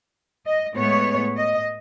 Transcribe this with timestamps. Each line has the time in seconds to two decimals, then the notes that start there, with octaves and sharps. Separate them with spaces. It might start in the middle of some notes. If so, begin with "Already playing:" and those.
0.46 D#5
0.76 A2 G#3 B3 C#5
1.37 D#5